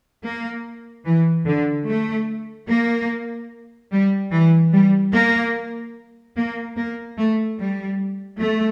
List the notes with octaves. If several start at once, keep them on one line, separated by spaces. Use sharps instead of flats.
A#3
E3
D3
A3
A#3
G3
E3
G3
A#3
A#3
A#3
A3
G3
A3